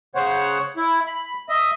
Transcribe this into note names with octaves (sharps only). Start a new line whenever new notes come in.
C#3 C5 C#5 F#5
E4
B5
D#5 E5